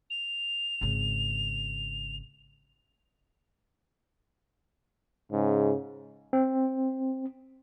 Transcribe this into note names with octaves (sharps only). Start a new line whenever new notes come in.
F7
G#1 C#3
G#2 C#3
C4